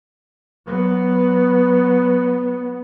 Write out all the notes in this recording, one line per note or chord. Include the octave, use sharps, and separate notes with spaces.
F#3 B3